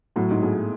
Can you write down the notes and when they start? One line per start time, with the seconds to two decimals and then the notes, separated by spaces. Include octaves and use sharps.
0.16 A2 F#3
0.31 G#2
0.42 A2 G#4